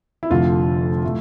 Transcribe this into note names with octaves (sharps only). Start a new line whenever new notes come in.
E4
F1 F2 D3 F3 A3 F4
A2 F3 A3